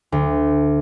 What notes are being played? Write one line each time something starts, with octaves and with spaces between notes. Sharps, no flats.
D2